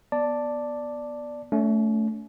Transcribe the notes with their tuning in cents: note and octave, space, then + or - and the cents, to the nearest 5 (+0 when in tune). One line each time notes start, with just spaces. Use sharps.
B3 -15 D5 +0 A5 +5
A3 +0 C#4 +40